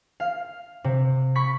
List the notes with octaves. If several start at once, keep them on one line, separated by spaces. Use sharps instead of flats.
F5
C3
B5 C#6 B6